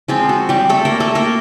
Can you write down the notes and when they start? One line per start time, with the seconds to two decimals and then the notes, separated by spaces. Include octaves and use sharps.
0.08 F3 G#3 C4 F4
0.29 F#4
0.49 G3 G4
0.69 A3 A4
0.85 A#3 A#4
1.00 A3 A4
1.15 A#3 A#4